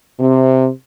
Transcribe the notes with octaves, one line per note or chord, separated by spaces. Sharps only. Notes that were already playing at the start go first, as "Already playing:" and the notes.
C3